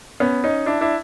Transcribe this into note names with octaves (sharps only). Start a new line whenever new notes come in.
B3 C#4
C#4 D#4
D4 E4
D4 E4